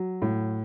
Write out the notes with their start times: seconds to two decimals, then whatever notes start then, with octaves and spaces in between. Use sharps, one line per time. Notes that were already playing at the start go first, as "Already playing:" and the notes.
Already playing: F#3
0.22 A2